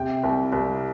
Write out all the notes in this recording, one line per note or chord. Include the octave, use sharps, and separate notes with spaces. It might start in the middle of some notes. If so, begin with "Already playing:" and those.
Already playing: C3 G5
C2
C2